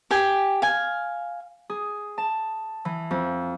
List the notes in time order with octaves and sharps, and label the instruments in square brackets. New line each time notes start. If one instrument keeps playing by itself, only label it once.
[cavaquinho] G4 G5 G#5
F5 G#5
[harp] G#4
A5
E3
F2